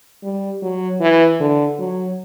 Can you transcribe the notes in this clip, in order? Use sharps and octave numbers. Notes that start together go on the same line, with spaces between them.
G3
F#3
E3
D3
F#3